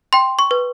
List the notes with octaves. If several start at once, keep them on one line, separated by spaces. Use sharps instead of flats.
G5 C6
C#6
B4